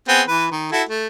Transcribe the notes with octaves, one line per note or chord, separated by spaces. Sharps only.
B3 C4 G#4
E3 B4
D#3
E4 F#4 A4
A3